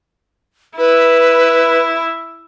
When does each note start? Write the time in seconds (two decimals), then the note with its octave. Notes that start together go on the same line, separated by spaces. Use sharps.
0.78 E4 B4